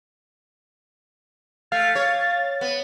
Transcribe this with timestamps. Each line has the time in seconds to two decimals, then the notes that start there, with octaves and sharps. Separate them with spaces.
1.72 A3 F5 A6
1.95 C#5
2.61 B3